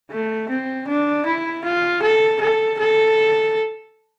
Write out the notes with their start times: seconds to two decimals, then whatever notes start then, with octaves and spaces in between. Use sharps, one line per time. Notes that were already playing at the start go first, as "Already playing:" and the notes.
0.11 A3
0.49 C4
0.88 D4
1.26 E4
1.65 F4
2.03 A4
2.41 A4
2.79 A4